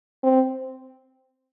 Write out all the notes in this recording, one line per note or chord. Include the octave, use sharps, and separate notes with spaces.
C4